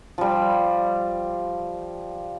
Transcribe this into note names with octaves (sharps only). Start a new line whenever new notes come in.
F3 G3